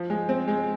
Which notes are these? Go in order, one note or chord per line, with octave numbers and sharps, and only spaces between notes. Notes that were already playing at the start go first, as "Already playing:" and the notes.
Already playing: F3
G#3
C4
G#3